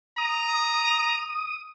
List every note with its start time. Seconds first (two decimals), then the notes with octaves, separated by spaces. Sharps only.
0.18 A#5 D#6